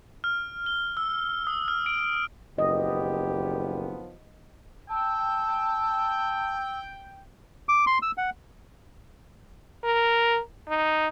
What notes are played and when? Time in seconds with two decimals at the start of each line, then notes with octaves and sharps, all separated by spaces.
0.24 F6
0.66 G7
0.97 E6
1.47 D#6
1.68 F6
1.86 D7
2.58 F#1 D#3 F3 B3 G4 D#5
4.89 G5 A5 E6
7.69 D6
7.87 C6
8.02 E6
8.18 F#5
9.84 A#4
10.69 D#4